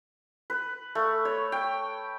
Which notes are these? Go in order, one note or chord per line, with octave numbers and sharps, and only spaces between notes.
B4
A3
C#5
G5